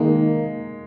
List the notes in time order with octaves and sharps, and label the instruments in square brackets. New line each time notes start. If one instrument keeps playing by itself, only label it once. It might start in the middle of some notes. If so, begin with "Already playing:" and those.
Already playing: [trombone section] D#3 A#3 D#4 [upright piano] G#3